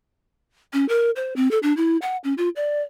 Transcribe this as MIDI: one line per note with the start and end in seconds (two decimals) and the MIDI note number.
0.73 0.87 61
0.89 1.11 70
1.16 1.34 72
1.36 1.50 60
1.51 1.59 69
1.63 1.75 62
1.77 1.97 64
2.02 2.17 78
2.24 2.34 61
2.38 2.49 65
2.56 2.82 74